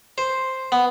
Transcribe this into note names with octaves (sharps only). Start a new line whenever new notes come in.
C5
B3